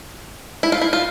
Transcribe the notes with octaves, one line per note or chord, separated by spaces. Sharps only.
E4
F4
E4
F4